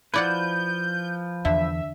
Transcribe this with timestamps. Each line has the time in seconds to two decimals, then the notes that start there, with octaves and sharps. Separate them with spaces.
0.14 F3 E4 B4 D5 F#5 G6
1.45 E2 D3 E5